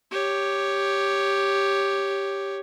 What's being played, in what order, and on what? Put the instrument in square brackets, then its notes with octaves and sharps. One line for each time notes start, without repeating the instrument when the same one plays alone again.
[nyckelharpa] G4 C#5